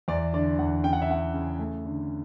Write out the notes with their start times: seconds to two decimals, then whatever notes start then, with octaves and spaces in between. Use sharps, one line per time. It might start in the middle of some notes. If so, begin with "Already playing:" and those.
0.08 E2 D5
0.33 D3 D5
0.59 E2 F#5
0.84 C#3 G5
0.93 F#5
1.02 E5
1.09 C#3 F#5
1.34 C#3
1.59 A3
1.85 D3